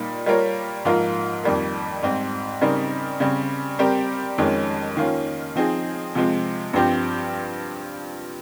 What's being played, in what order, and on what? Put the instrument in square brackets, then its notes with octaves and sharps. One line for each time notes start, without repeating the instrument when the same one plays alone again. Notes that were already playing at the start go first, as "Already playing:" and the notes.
Already playing: [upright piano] A#2 G3 A#3 D#4
G3 A#3 F4 A#4 C#5
G#2 F3 A#3 F4 A#4
F2 D#3 G3 A#3
G#2 G3 C4
C#3 G3 C4 D#4 A#4
C#3 G3 C4
G3 C4 G4 A#4
F2 D#3 G#3 C#4
D#3 A#3 C#4 F4
F3 C4 D#4 G#4
C3 F3 G#3 C4
G2 F3 C4 G4